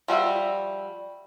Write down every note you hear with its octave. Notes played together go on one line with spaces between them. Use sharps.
F3 G3 F#4 E5